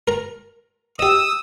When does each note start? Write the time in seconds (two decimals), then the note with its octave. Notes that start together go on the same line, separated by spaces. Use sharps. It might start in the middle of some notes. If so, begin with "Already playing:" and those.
0.08 A#4 A#5
0.99 G4 D#5 D#6 E6